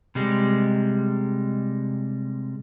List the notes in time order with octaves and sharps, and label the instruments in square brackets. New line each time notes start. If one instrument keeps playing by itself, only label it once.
[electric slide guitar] C3 G3 G#3